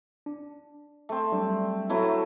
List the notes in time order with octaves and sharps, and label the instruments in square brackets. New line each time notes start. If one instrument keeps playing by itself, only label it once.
[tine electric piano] D4
[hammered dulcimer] A3 C4
[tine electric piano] F#3 G3 D4
[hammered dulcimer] F#3 A3 E4 [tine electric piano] B3 C#5